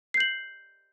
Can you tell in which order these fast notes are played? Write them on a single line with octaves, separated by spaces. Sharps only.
C7 G6 F#7